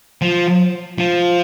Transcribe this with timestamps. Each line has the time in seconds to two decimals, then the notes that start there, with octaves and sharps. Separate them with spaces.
0.22 F3
0.99 F3